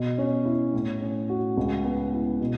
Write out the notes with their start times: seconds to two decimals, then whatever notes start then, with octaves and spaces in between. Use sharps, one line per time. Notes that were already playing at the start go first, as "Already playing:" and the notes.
Already playing: B2
0.18 C#4
0.45 E4
0.73 A2
1.01 C#4
1.29 F#4
1.57 C#2
1.84 B3
2.13 E4
2.40 B2